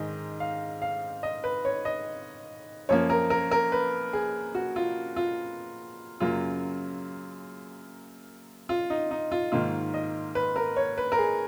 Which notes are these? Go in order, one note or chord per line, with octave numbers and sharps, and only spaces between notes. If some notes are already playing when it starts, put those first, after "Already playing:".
Already playing: G#2 D#3 G#3 D#5
F5
F5
D#5
B4
C#5
D#5
F#2 F3 A#3 C#5
A#4
A#4
A#4
B4
G#4
F#4
F4
F4
F#2 C#3 F#3 A#3 F4
F4
D#4
D#4
F4
G#2 D#3 A#3 F4
D#5
B4
A#4
C#5
B4
A#4
G#4